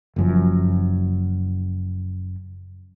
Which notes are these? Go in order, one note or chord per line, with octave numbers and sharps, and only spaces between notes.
F#1 F#2 F3